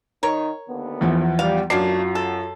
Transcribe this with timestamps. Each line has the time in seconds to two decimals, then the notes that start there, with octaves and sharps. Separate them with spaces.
0.23 D#3 A#4 C#5
0.68 D#2 D3 B3
1.01 E2 E3 F3
1.39 G3 F5
1.70 F#2 A3 A#3 D4 F4 F#4 C7
2.15 A4